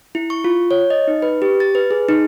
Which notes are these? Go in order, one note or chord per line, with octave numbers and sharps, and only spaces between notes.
E4
C#6
F4
C#5
D#5
D#4
B4
G4
A6
B4
G#4
D#4